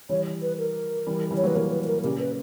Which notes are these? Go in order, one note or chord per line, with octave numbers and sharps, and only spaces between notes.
E3 G3 C#5
B4
A#4
E3 G3
E3 G3
C#5
F#3 A#3 B4
F#3 A#3 A#4
B4
B4
A#4
A#2 C#3 G4
B4